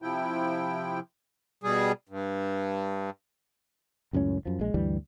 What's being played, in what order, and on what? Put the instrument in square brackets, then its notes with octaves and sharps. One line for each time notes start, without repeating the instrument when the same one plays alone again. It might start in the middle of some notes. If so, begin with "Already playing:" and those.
[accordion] C3 F3 E4 G5
B2 G3 G#4
G2
[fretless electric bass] C#2 F#2 A2 C#4
F#2 F3
A#1 G#3
D2 G2 E3 G3